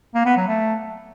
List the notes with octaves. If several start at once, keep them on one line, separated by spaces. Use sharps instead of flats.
A#3
B3
F#3
A3